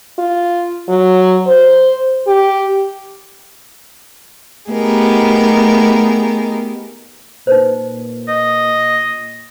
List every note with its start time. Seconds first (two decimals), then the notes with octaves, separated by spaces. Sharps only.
0.18 F4
0.89 F#3
1.47 C5
2.27 G4
4.70 A3 B3 D#4 G4 G#4 A#4
7.47 A#2 D#4 B4 C5
8.28 D#5